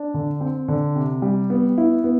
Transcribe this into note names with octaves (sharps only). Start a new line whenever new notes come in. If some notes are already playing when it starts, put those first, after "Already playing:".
Already playing: D4
D3
C4
D3
C3
G3
B3
E4
B3